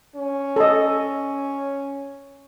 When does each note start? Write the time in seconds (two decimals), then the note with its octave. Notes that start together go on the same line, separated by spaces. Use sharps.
0.16 C#4
0.56 A4 D#5